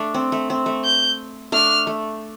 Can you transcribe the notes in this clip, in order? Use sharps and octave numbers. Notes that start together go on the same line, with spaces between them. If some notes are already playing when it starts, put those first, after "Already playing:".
Already playing: A3 D4
C4
A3
C4
A3
G6
A3 D4 F6
A3